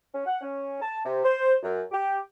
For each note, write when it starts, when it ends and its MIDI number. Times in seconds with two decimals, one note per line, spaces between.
0.14 0.23 61
0.26 0.38 78
0.41 0.80 61
0.81 1.00 81
1.05 1.22 48
1.24 1.55 72
1.63 1.81 42
1.92 2.18 67